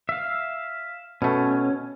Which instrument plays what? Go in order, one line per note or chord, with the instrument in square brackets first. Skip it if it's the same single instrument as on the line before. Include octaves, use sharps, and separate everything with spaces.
[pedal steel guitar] E5 F5
[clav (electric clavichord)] B2 A3 [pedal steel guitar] C#4